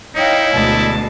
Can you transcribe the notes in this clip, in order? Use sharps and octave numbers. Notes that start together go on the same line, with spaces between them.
D#4 E4 C#5 F5 G5
D2 B2 G#3 A5